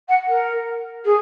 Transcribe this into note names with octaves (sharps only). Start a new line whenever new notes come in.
F#5
A#4
G#4